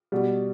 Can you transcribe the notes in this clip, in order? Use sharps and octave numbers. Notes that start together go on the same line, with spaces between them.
B2 G3